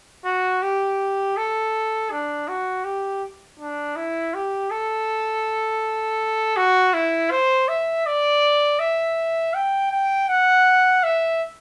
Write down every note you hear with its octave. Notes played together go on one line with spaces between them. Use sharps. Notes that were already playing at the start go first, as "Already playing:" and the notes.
F#4
G4
A4
D4
F#4
G4
D4
E4
G4
A4
F#4
E4
C5
E5
D5
E5
G5
G5
F#5
E5